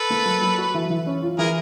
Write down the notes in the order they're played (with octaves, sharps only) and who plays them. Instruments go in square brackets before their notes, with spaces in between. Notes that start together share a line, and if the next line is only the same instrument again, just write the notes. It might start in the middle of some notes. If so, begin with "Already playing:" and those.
Already playing: [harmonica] A4 B4
[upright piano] A#3
F#3
F#3
F#4
E3
E3
C#4
F4
[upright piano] E3 [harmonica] G#4 A#4